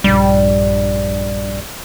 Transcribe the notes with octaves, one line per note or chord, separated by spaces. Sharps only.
A#1 G2 G3